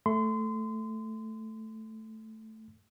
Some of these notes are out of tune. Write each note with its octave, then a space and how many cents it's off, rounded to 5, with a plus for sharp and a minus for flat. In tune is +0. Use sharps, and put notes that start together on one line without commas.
A3 +0 C6 -30